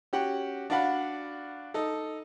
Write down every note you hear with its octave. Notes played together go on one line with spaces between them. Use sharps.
C#4 F#4 G4 F#5 G5
D4 F#4 D5 F5 F#5 B5
D#4 A4